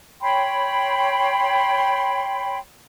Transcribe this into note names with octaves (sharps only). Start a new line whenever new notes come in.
C#5 G5 B5 C6